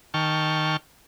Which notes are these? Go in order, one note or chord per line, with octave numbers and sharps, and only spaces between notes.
D#3 G5 A5 C#6 F6